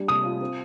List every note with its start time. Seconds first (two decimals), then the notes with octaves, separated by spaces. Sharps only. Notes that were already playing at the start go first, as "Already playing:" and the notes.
Already playing: G3 D4
0.08 C3 D#6
0.24 F4
0.41 C4